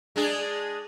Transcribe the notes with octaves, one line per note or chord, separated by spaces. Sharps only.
G#3 D4 G#4